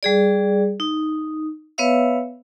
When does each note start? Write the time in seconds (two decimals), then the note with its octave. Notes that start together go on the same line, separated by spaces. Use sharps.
0.03 G3 G#4 D5
0.80 D#4
1.78 B3 B4 C#5 E5 F5 E6